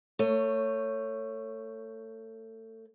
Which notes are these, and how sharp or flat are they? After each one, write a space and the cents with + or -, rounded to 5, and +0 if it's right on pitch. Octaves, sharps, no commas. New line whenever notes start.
A3 +30 C#5 +0